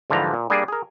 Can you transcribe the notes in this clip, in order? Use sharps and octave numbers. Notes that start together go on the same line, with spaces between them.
G#2 D3 E3 F3 G3 A#5
A#2
G3 A#3 D4 G#4
G#4 A#4